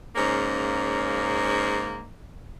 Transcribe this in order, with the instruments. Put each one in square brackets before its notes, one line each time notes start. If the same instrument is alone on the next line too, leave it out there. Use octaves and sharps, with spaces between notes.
[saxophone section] G#2 C#3 A#3 C#4